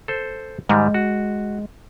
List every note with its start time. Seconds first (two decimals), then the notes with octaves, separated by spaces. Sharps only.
0.08 A4 C5
0.69 G#2 D#3 G3 G#3
0.94 F#4